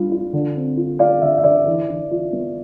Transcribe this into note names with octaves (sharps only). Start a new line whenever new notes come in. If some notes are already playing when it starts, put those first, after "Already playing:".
Already playing: G3 D4 F4
F4
D3
C4
F4
F4 D5 F5
D3 E5
E5
D3 D5
E3
E3
F4
B3